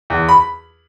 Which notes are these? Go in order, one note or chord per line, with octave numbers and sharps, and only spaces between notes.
E2
B5